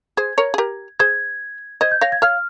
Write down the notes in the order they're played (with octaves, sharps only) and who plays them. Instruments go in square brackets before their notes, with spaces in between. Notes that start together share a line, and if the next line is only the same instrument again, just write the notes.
[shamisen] G#4 C5 [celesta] G#6
[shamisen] A#4 C#5
G#4
G4 A#4
[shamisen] G#4 C5 [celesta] G#6
[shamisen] C5 D#5 [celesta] G#6
[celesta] G6
[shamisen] C#5 F5 [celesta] A#6
[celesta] G#6
[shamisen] C#5 F5 [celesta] F6